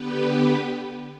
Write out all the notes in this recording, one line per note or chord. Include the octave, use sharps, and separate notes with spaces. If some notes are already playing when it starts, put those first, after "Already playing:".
Already playing: D3 B3 G4 B4